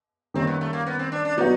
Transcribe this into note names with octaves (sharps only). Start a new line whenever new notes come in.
D#3 G3 A#3 C4 C#4
B3
A3
A#3
B3
C4
D4
D4
F#3 B3 D4 D#4 F#4